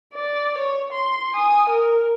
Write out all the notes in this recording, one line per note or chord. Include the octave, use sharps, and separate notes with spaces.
D5
C#5
C6
G#5 D#6
A#4